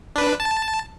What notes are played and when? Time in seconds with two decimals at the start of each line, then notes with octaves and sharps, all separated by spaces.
0.16 D4 B4
0.40 A5